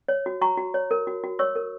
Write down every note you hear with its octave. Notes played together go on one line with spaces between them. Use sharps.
C#5
F#4
F#4 A#5 C#6
F#4
C#5
A#4
F#4
F#4
C#5 C#6 E6
A#4